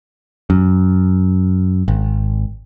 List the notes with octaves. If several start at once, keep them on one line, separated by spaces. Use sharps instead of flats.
F#2
G#1